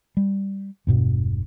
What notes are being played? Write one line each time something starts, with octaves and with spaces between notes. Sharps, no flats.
G3
E1 G2 B2